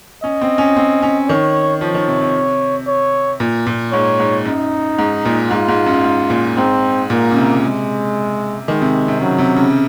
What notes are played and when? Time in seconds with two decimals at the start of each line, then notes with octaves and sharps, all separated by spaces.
0.23 C#4 D#5
0.41 C4
0.58 C#4
0.77 C4
1.02 C#4
1.29 D#3 C#5
1.81 F3 C#5
1.94 D#3
2.08 C3
2.21 C3
2.87 C#5
3.40 A#2
3.67 A#2
3.92 G#2 C#5
4.19 G#2
4.45 F#2 D#4
4.99 G#2
5.25 A#2
5.51 G#2 F4
5.68 G#2
5.86 F#2
6.04 G#2
6.30 A#2
6.57 G#2 C4
7.10 A#2 A#3
7.31 C#3
7.37 C3
7.63 G#3
8.68 D#3 G#3
8.82 C3
9.08 C3
9.21 C#3 F#3
9.38 C3
9.56 C#3